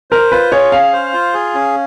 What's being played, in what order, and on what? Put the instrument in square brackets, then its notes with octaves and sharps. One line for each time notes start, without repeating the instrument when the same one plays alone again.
[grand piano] A#4 [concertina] C5
[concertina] F4 [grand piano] B4
[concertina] G#4 [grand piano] C#5
[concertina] C#4 [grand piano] F5
[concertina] C5
F4
G#4
C#4